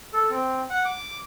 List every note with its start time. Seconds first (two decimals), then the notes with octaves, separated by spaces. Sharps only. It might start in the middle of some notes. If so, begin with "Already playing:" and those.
0.14 A4
0.31 C4
0.70 F#5
0.85 D6